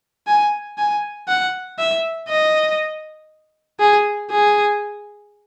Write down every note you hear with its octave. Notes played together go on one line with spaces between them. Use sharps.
G#5
G#5
F#5
E5
D#5
G#4
G#4